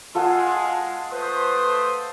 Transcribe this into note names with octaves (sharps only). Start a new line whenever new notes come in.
G#3 F4 A4 F#5
A3 B4 C5 C6 D#6